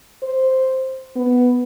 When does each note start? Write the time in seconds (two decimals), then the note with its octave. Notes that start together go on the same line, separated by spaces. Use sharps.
0.23 C5
1.16 B3